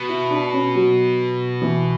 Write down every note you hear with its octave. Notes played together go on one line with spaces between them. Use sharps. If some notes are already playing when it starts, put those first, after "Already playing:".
Already playing: B2
E4
D4
C#4
F#3
E3